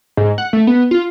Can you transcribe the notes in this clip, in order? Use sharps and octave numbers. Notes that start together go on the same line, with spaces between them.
G#2
F#5
A3
B3
F4